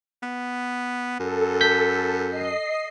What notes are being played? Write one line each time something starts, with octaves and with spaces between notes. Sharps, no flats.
B3
F#2 A4
G6 B6
D#5 C7